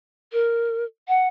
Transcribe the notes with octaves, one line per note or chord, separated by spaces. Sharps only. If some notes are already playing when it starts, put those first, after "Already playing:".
A#4
F#5